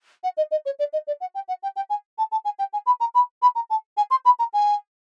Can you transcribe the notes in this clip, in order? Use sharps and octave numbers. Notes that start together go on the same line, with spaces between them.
F#5
D#5
D#5
C#5
D5
D#5
D5
F#5
G5
F#5
G5
G5
G#5
A5
A5
G#5
G5
G#5
B5
A#5
B5
B5
A#5
A5
G#5
C6
B5
A#5
G#5